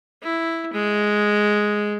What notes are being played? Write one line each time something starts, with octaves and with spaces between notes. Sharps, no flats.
E4
G#3